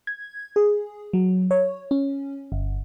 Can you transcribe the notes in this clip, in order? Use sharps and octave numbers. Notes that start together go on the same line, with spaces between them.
G#6
G#4
F#3
C#5
C#4
G1